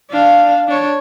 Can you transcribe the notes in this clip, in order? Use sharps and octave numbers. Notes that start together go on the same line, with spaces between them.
D4 F5
D4 C#5